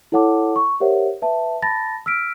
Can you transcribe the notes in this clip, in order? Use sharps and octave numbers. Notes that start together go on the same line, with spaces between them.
E4 A4 C#5 F#5 A5 D6
C#6
G4 A#4 C5 C#5 E5 F#5
B4 E5 A5
A5 B5 A6 A#6
E6 F6 B6 D7